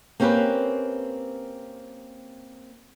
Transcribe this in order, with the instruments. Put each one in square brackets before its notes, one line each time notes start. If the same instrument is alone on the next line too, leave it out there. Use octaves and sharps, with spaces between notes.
[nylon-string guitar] A#3 C4 C#4 G4 A#4 B4